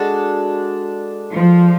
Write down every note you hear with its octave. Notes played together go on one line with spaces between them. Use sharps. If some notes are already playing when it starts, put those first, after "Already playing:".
Already playing: G#3 D4 F#4 A4
F3